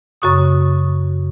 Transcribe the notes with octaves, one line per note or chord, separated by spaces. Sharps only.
F#2 C#3 F#4 C#6 D#6